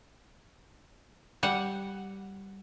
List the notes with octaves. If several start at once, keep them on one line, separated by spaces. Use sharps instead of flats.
G3 F#5